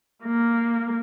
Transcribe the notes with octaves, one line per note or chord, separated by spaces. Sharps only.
A#3